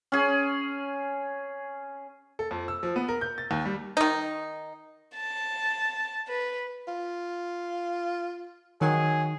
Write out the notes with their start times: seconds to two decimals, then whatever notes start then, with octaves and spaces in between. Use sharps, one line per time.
0.12 C#4 G#4
2.39 A4
2.51 F2
2.68 E6
2.83 F3
2.96 B3
3.09 A#4
3.21 G6
3.38 A6
3.51 D#2
3.65 G3
3.97 D#3 D#4
5.17 A5
6.28 B4
6.88 F4
8.81 D#3 F#3 G#4